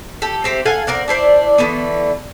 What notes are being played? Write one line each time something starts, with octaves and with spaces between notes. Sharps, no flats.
G4 A4
C4 G4 C5 E5
A4 F5 F#5 G#5
C4 A#4 D5 F#5
D4 E4 C5 D5
D3 E3 A3 B3